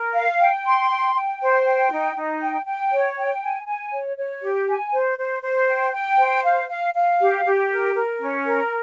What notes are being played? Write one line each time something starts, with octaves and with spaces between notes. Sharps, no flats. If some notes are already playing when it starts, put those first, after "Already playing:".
Already playing: A#4
F5
G5
C6
G5
G5
C5
G5
D#4
D#4
G5
G5
C#5
G5
G#5
G#5
C#5
C#5
G4
G#5
C5
C5
C5
G5
G5
C5
F5
F5
F5
G4
G4
A#4
A#4
C#4
A#4